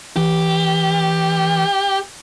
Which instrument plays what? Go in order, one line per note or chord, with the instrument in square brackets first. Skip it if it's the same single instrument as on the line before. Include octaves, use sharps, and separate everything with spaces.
[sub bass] E3 [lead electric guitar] G4